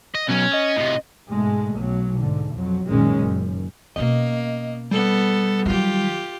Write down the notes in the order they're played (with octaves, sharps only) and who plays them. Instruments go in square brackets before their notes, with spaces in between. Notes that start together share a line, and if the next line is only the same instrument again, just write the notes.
[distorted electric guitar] D#5
[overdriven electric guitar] B2 F#3 [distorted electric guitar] C#4
[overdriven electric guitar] D#5
[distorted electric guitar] A2 C3
[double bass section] G#2 B2 G#3 A3
B1 F#3
G#2 D3
F2 F#3
A#1 F#2 A#2 D#3 G#3 C#4
F#1 F#2
[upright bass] B2 C#4 [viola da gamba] A#3 [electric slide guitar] D#5
[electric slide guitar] G3 [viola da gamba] B3 A4
[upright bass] D#3 F#3 [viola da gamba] F4 G4